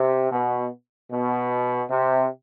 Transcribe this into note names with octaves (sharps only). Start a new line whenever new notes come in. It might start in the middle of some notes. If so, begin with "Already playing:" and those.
Already playing: C3
B2
B2
C3